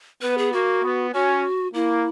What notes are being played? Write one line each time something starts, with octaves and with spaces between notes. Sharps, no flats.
B3 B4
G#4
A#3 F#4
B3
C#4 F#4
A#3 E4